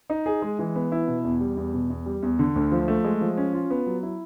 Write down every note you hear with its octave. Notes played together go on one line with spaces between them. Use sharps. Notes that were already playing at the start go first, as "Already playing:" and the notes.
D#4
G#4
G#3
E3
B3
E4
B2
E2
G3
E2
B2
E2
G3
E2
D3
D2
F3
A3
G#3
F3
C#4
F4
B3
F#3
E4